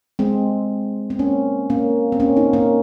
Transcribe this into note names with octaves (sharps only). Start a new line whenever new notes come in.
G#3 C4
C4
A#3 C#4
A#3 C#4
C4
A#3 C#4
C4 D#4
A#3 C#4